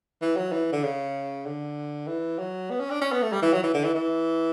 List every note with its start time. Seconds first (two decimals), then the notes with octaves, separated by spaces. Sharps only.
0.22 E3
0.37 F#3
0.52 E3
0.72 D3
0.84 C#3
1.46 D3
2.07 E3
2.39 F#3
2.70 B3
2.80 C#4
2.91 D4
3.01 C#4
3.12 B3
3.22 A3
3.33 G3
3.42 E3
3.53 F#3
3.63 E3
3.74 D3
3.84 E3
3.94 E3